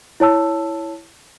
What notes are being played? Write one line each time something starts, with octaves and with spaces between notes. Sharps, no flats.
E4 C#5 A5 E6